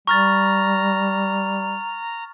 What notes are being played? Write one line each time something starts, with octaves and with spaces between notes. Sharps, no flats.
G3 A#5 C#6 F6 A6